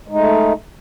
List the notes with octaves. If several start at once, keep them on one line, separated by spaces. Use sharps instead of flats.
G#3 A3 D#4